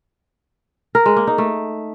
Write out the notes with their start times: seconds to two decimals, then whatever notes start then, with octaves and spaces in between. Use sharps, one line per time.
0.95 A#4
1.06 G#3
1.16 A#3
1.27 D#4
1.38 A3